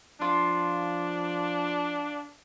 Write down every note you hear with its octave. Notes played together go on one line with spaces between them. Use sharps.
F3 D4 F4